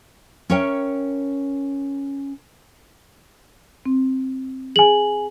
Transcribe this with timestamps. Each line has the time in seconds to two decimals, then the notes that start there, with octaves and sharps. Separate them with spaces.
0.50 C#4 A#4 C#5 E5 G5
3.85 C4
4.76 G#4 G#5 F#7